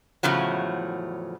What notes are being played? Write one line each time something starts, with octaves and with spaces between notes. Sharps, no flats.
E2 A2 C#3 F3 F#3